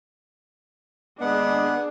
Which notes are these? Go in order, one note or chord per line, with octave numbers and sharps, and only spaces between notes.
D#2 G#3 B3 D4 G#4 D#5 F#5